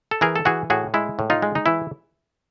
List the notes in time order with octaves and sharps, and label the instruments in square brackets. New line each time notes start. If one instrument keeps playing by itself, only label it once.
[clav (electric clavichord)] A4
E3 G#4 A#4
A4
E3 F#4 G#4
A2 F#4 G#4
G#3 E4
A2
D#4 F4
G#3
D#4
E3 E4